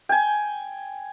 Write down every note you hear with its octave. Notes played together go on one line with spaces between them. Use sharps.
G5 G#5